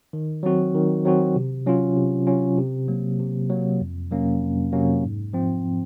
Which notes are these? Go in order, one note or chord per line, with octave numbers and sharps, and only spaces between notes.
D#3
F#3 C4 F#4
D#3
F#3 C4 F#4
C3
F#3 C#4 F4
C3
F#3 C#4 F4
C3
F#3 A#3
C3
F#3 A#3
F2
C3 F#3 A#3 C#4
F2
C3 F#3 A#3 C#4
G#2
F3 C4